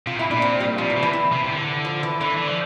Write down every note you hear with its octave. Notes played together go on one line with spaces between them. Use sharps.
C3 F4
A#2
E4
A#2 D4
C4
G3
C3 F3
E3
C3
E3
E3
C3
C3
D3
F3
E3
D3 E3
E3
F3